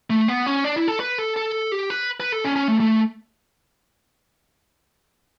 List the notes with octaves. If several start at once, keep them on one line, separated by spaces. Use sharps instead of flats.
A3
B3
C#4
D4
E4
A4
B4
A4
A4
G4
B4
B4
A4
C#4
C#4
A3
A3